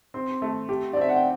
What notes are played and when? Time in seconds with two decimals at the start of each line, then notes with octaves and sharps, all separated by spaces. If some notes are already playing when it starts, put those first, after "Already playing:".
0.14 C4 C6
0.42 A3
0.69 G4
0.93 D5
0.97 C4 E5
1.09 F#5
1.16 G5